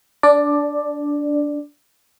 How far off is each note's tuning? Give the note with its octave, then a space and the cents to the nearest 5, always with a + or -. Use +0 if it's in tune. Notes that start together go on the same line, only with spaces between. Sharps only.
D4 -15 D5 +10